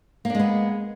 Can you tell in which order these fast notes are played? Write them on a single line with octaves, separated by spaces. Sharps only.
A#3 D4 G#3 B3